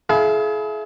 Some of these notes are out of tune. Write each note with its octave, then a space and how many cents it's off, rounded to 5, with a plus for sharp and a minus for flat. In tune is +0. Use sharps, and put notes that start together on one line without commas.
E4 +0 G#4 +40 F5 +0